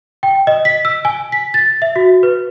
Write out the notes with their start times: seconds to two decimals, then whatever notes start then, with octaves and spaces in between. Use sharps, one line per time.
0.23 G5
0.47 D#5
0.65 B6
0.85 E6
1.05 G#5
1.32 B6
1.54 A6
1.82 E5
1.96 F#4
2.23 B4